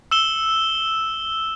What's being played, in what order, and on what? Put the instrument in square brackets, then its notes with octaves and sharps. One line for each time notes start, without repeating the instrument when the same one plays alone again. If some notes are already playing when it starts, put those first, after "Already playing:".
[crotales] E6 E7 G7